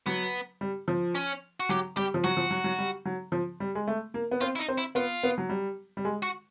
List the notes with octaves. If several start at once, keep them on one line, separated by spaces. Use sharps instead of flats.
F#3 B3
G3
F3
C#4
F#4
F#3 G4
G3 G4
F3
F#3 F#4
F3
F#3
F#3
G3
F#3
F3
G3
G#3
A3
A#3
B3
C4 F4
E4
D#4
C4
E4
B3 F4
B3
F#3
G3
G3
G#3
F#4